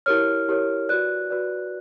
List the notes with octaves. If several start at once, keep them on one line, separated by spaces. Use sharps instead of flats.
E4 G4 A#4 C#5 F6
E4 G4 A#4 C#5
F#4 B4 D5 F#6
F#4 B4 D5